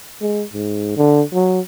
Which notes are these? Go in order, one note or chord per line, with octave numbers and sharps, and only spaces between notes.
G#3
G#2
D3
F#3